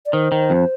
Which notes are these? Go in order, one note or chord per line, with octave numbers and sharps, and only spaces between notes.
D5
D#3 C5
D#3
F2